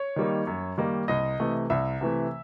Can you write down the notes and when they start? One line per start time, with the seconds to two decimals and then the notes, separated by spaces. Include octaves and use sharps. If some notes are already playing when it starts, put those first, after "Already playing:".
Already playing: C#5
0.16 D#3 G3 A#3 D#4
0.47 F#2
0.78 D#3 G3 A#3 D#4
1.08 C2 D#5
1.40 C3 E3 A3
1.70 C2 E5
2.01 C3 E3 A3